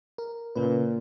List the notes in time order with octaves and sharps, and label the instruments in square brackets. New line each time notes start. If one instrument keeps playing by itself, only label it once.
[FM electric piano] A#4
[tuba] A#2 [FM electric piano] C#3 C#4 B4